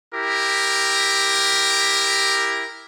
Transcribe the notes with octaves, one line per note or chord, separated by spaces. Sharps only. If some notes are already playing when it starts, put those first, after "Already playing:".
E4 G4 A#4